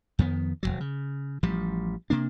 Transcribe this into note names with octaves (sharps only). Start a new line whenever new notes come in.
F2 D#3 B3
D#1 C2 F#3
C#3
A1 F3 G3
C3 A#3 D4